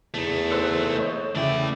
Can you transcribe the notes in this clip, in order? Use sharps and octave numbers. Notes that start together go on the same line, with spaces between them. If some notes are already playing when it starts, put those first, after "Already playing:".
E2 A3 D#4
A4 C5 E6 F#6
C#5 D#5 G6
E2 C#3 A3 D5 E5 G5